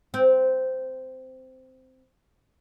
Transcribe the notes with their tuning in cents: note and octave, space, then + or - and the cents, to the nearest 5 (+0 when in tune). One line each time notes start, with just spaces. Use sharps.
C4 -10